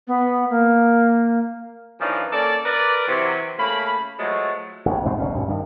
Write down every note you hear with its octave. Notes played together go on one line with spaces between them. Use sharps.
B3
A#3
F#2 E3 F3 D4 D#4
A#3 C#4 A4 D5
A#4 B4 D5
C3 E3 F#3
C#3 A3 A#3 B5
F3 F#3 G#3 A3
A1 F2
C2 G#2 B2 C4
F1 D2 B2 C#4
A#1 G2 B2
G2 D#3